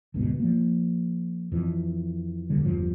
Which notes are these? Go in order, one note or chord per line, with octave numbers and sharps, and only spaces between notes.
G1 D2 G#2 B2
F3 A#3
F2 E3
D#1 A#1 D3 G3
F#1 E2 G2 F3